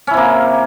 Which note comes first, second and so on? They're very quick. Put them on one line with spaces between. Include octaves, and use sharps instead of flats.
C#4 E4 C3 A#3